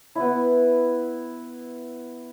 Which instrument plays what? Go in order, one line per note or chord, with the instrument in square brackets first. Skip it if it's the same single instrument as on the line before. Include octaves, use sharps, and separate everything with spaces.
[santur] B3 E4